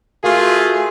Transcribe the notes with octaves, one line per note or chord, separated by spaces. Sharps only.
A3 F4 F#4 G#4 A#4 F5